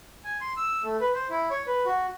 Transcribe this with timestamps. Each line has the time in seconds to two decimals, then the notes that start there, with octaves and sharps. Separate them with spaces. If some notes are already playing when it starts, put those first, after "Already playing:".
0.24 G#5
0.41 C6
0.57 E6
0.84 A3
1.01 B4
1.14 C5
1.30 E4
1.51 C#5
1.67 B4
1.85 F#4